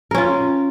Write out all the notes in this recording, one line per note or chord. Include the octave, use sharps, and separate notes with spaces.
C#4 F4 A#4